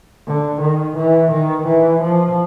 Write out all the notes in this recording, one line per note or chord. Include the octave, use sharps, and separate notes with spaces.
D3
D#3
E3
D#3
E3
F3